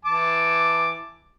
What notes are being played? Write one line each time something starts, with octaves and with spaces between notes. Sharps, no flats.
E3 A5 D6